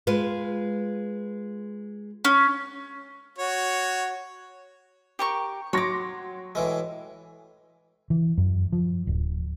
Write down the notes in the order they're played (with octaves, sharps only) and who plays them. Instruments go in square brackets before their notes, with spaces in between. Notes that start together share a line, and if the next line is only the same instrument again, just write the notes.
[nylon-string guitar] G#3 F4 B4
[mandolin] C#4
[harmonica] F#4 C#5
[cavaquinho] G4 A#4 C#6
[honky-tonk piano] F#3 C6 A#6 [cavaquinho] C#5 D6
[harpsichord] A2 E3 G#3
[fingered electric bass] E3
F#2
F3
D1